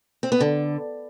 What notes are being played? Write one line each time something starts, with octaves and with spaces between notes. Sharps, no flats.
C4
B3
D3